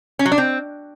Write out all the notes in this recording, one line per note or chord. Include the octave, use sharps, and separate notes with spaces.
C#4
F#3
D4
C4